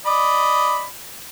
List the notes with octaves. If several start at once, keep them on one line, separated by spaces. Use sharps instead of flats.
D5 D#5 B5